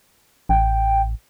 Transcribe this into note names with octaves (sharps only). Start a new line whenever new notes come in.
A1 G5